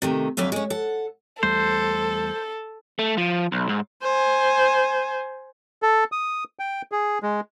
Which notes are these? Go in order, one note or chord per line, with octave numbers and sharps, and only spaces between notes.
C3 D#3 A3
F2 D3 F#3 E5 F5
G#3 C#4
A4 F#5
E2 G3 A3 A4 C5
A3
F3
B1
G#2
C5 G#5
A4
D#6
G5
G#4
G#3